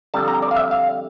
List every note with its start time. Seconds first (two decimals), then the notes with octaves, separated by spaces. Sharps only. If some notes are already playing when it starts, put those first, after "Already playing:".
0.14 F2 D3 G3 A5
0.28 A#5
0.42 D5
0.51 F5
0.56 E5
0.71 F5